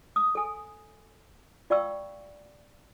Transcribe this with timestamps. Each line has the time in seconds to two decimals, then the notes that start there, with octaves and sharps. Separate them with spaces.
0.16 D#6
0.35 A4 G#5
1.70 F4 D5 F5 G5 C#6 E6